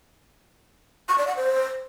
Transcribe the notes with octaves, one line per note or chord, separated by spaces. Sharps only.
C#6
D5
F#5
C5